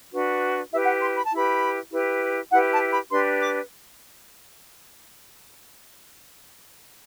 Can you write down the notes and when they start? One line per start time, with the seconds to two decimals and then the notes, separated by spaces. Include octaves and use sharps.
0.12 D4 F#4 B4
0.71 E4 G4 B4 E5
0.86 F#5
1.01 C6
1.16 B5
1.25 A5
1.31 E4 G4 B4 B5
1.91 E4 G4 B4
2.51 E4 G4 B4 F#5
2.72 A5
2.91 B5
3.11 D4 G4 B4 C6
3.40 D6